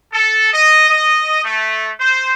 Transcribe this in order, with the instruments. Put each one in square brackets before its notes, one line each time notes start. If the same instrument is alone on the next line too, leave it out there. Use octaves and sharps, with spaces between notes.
[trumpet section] A4
D#5
D#5
A3
C5